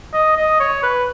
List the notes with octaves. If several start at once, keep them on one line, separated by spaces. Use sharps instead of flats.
D#5
D#5
C#5
B4